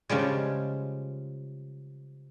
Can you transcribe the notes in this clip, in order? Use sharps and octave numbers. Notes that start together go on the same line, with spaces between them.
C#3 F3 G3 G#3